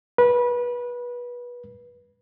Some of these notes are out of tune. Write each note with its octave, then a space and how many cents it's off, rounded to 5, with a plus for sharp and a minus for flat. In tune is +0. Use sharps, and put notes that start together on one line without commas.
B4 -25